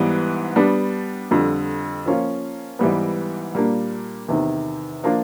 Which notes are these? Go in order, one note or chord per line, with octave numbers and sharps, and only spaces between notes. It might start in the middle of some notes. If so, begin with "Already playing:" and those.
Already playing: G#2 E3 G3 B3
G3 B3 D4
F2 D3 G3
F3 A#3 C#4 F4
G#2 E3 G3 B3
A#2 G3 A#3 D4
E2 C3 D#3
F3 A#3 D4 F4